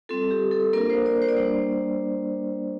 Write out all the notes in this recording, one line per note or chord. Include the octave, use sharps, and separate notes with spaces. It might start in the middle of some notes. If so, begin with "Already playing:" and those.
G3 C4 F4 A4
G4
A4
A#3 D4 F4 A#4
C5
D5
C5
D5
G3 A#3 D4 C5